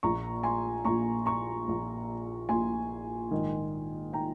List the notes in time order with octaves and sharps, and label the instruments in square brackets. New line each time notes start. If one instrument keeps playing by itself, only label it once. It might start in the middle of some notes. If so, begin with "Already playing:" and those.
[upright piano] A#1 A#2 A#5 C#6
G#5 C6
A#1 A#2 A#5 C#6
A#5 C#6
A#1 A#2
A#1 A#2 G#5 C6
A#1 G#2 D#3
D#3 G5 A#5